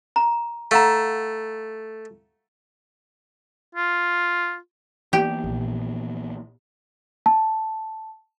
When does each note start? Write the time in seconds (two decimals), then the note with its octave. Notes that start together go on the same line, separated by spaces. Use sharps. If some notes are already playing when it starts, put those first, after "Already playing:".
0.16 A#5
0.71 A3 F5 F#5 A#5
3.75 F4
5.13 E3 A#3 B3 G4
5.44 A#1
7.26 A5